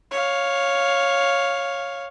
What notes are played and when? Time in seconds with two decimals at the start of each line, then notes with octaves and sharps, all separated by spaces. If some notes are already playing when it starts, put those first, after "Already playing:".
0.11 C#5 F5